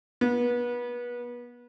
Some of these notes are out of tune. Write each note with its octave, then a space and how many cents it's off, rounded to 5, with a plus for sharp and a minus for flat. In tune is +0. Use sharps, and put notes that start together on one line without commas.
B3 -30